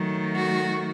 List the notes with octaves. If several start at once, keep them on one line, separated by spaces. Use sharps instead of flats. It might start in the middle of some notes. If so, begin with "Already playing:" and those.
Already playing: D#3 F#3 A3
F#4